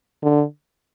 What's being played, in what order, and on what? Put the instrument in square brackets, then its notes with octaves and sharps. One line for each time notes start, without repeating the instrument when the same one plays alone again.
[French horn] D3